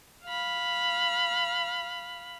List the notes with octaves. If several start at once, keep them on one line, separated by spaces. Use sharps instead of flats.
F5 B5